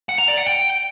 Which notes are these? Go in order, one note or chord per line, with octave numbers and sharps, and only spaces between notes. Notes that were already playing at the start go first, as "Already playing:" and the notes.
F#5
A#5
D5
F#5
G5